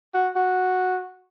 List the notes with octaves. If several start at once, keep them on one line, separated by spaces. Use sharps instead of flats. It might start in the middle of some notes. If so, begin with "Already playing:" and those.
F#4
F#4